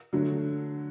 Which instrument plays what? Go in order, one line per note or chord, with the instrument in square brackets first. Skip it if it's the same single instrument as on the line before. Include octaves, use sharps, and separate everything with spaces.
[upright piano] D3 F#3 A3